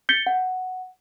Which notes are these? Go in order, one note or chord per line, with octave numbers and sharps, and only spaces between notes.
G6 A6 B6 C#7 G7
F#5